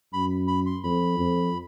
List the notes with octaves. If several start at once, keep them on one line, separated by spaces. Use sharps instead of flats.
F#2 B5
B5
C6
F2 B5
F2